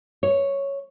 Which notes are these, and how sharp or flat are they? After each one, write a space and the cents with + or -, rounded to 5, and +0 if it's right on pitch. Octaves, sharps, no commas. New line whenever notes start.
C#5 +0